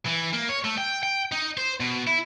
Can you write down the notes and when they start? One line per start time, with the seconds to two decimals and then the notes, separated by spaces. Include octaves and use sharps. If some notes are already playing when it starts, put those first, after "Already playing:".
0.07 E3
0.33 A#3
0.49 C#5
0.64 A3
0.78 G5
1.03 G5
1.32 D#4
1.57 C5
1.80 B2
2.07 E4